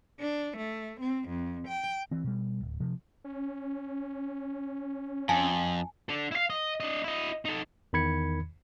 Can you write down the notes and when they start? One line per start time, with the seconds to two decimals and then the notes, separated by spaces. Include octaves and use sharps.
0.20 D4
0.57 A3
1.00 C4
1.29 F2
1.68 G5
2.11 E3 C4
2.24 B2 G3
2.61 D1
2.80 C3 F3
3.24 C#4
5.29 F2 G#5 A5
6.09 D4 A4
6.31 E4 F5
6.50 D#5
6.80 D4 D#5
7.04 E4 D#5
7.45 D#4 A4
7.93 E2 D#3 B5 G#6 C#7